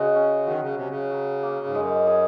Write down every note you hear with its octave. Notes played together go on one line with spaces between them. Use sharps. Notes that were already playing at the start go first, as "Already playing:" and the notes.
Already playing: C#3 G#3 F#4
C#4
D#3 F#3
C#3
C3 C#4
C#3
F#3
A#3
G#2
F#2 G#3
G#4